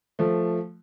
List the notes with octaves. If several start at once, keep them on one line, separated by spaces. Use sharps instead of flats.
F3 A3